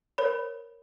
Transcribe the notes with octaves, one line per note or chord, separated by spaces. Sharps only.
A#4 C5 C#5 B5